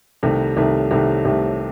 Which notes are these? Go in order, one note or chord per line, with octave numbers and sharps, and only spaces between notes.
C2 C3 D#3 A3
C2 C3 D#3 A3
C2 C3 D#3 A3
C2 C3 D#3 A3